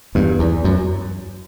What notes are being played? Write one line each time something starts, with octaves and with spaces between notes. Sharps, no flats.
E2 G2
E2
F#2